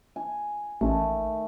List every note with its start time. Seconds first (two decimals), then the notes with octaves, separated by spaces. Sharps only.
0.16 G#5
0.81 A1 D#3 A3